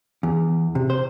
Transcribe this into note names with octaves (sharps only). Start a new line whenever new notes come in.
E2
C3
C5